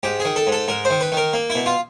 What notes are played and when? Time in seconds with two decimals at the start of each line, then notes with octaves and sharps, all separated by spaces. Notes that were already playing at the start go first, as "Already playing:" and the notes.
0.03 G#2 G4
0.20 G#4
0.25 D#3
0.36 A4
0.47 G#2
0.52 A4
0.68 G#2 A#4
0.85 C5
0.90 D#3
1.01 B4
1.12 D#3
1.17 A#4
1.33 A#3
1.50 E4
1.55 B2
1.66 F4